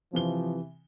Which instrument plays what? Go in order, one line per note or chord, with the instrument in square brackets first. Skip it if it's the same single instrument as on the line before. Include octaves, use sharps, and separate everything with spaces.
[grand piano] C3 E3 G7 [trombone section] F3